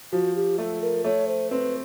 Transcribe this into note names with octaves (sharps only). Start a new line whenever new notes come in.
F3 F#4
G4
A3 A4
A#4
A3 C#5
C5
C4 B4